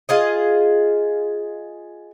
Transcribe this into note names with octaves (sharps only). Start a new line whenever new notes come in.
F4 G#4 D#5